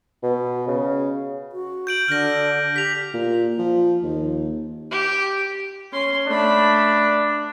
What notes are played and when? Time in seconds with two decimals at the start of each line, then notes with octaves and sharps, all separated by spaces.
0.23 B2
0.67 C#3
1.52 F#4
1.87 G6 D7 F#7
2.08 D3 F6 A#6
2.76 G4 B6 F7
3.14 A#2
3.59 F3
4.03 D#2
4.91 G4
5.92 C#4 C6
6.28 A3 D4 B5